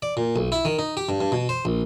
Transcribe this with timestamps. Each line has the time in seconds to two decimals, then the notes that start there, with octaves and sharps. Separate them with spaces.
0.02 D5
0.17 A#2
0.36 B1
0.52 E4
0.65 D#3
0.79 D#4
0.97 G4
1.09 G2
1.21 G2
1.32 B2
1.49 C5
1.65 A#1